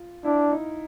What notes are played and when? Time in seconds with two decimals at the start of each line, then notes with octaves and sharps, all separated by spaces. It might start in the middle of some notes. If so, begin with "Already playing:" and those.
Already playing: F4
0.25 D4 E4
0.51 D#4